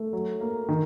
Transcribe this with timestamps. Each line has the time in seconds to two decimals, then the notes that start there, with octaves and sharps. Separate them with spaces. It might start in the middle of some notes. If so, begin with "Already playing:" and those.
Already playing: A3
0.13 F#3
0.41 A#3
0.69 D#3